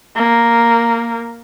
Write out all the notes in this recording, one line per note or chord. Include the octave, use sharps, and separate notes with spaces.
A#3